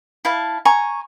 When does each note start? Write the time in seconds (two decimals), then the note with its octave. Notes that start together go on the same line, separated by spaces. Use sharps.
0.25 E4 F5 A5
0.65 G#5 A#5 C#6